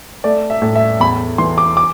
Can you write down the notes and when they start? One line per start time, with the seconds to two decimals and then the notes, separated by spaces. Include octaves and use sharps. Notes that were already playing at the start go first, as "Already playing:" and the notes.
0.24 A3 D5
0.50 E5
0.62 A2
0.75 E5
1.00 E2 B5
1.38 E3 C6
1.58 D6
1.77 D6